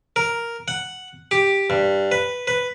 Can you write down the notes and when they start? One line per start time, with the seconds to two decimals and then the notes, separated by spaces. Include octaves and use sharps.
0.16 A#4
0.68 F#5
1.31 G4
1.70 G2
2.12 B4
2.47 B4